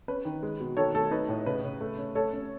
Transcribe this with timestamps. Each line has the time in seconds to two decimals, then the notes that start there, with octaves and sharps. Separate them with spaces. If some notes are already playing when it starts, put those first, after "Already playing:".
0.08 C#4 B4
0.25 D#3
0.43 G#3
0.60 B2
0.77 D#3 A4 C#5
0.94 A3 A4
1.11 D#4 B4
1.29 A2
1.46 C#3 B4
1.64 C#3
1.81 A3
1.98 C#4
2.15 A3 A4 C#5
2.33 C#4